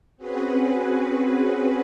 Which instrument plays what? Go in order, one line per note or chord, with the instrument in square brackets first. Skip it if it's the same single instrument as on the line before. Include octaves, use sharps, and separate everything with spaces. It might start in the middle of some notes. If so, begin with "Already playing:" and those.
[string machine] C4 C#4 F#4 G#4 B4